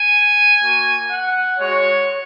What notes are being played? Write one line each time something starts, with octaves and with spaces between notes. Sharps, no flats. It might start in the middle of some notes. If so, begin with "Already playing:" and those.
Already playing: G#5
A#3 F#4
F#5
G#3 F#4 C#5